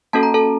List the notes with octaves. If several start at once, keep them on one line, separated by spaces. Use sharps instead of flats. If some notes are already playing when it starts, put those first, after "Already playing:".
A#3 C#4 F#4 A4 A5
A#5
A4 A5